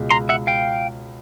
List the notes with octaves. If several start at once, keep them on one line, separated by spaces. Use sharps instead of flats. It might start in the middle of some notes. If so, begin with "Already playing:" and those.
Already playing: C#2 B2 G#3
A#5 C6
E5 F#5
F5 G5